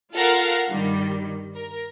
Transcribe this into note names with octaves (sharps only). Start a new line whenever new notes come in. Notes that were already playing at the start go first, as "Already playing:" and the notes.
F4 A4 A#4 F5 F#5
G2 D#3 G3
A#4